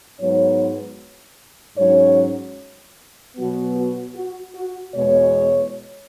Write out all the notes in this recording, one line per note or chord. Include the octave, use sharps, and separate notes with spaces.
G#2 F#3 B3 C#5
G#2 F#3 C#4 C#5
B2 F#3 B3 F#4
F#4
F#4
F#4
E2 B2 G#3 C#5